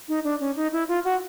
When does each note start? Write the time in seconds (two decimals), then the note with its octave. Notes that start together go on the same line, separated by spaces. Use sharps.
0.08 D#4
0.24 D4
0.40 C#4
0.56 D#4
0.73 E4
0.88 F4
1.05 F#4